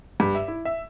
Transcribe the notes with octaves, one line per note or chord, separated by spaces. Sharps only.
G2
E5
E4
E5